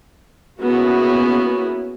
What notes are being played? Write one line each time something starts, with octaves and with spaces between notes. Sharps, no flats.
A#3 B3 C#4 E4 F#4 G#4